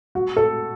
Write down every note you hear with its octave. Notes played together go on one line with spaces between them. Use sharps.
F#4
A4